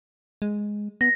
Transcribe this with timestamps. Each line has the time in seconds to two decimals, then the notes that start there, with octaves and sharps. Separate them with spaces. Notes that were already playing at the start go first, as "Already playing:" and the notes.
0.42 G#3
1.01 B3 A#6